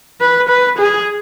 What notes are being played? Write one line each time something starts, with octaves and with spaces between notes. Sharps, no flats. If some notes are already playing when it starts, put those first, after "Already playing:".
B4
B4
G#4